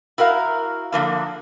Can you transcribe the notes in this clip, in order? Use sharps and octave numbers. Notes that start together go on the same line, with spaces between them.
E4 F#4 A#4 F5
D3 F3 A#3 E4